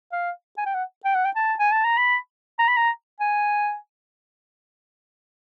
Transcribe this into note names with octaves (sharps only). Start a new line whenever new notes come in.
F5
G#5
G5
F#5
G5
F#5
G5
A5
G#5
A5
A#5
B5
A#5
B5
A#5
G#5